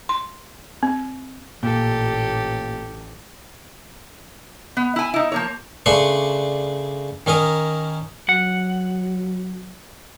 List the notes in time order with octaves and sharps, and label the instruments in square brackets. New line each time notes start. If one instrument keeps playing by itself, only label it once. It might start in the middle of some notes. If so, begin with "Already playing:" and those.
[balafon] C6
C4
[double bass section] A1 [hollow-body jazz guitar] A#2 [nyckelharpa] G4 A4
[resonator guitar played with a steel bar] B3
E4 G#5
D#4 E4
F3 A#3 C#5
[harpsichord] C#3 A3 D4 B4 C6 C#6
D#3 C#4 A#4 D#5
[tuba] F#3 [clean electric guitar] F#5